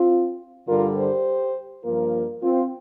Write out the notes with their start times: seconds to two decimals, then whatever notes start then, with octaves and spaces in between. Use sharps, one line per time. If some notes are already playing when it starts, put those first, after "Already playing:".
Already playing: C4 F4
0.68 G2 D3 G3 F4 A#4
0.96 G4 C5
1.84 G2 F3 A#3 F4 A#4
2.42 C4 F4